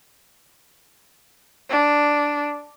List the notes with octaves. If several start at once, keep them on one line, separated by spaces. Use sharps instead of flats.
D4